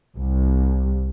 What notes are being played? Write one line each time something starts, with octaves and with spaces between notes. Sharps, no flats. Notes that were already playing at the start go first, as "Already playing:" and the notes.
C2